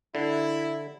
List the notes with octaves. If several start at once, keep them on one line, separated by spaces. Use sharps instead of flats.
D3 E4